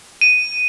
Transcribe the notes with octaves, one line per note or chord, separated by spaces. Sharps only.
D#7